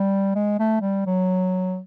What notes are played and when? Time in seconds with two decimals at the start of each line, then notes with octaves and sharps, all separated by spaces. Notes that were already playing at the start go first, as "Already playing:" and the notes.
Already playing: G3
0.35 G#3
0.59 A3
0.82 G3
1.06 F#3